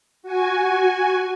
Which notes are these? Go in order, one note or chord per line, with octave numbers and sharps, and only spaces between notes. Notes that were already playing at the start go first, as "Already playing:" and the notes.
F#4 G#5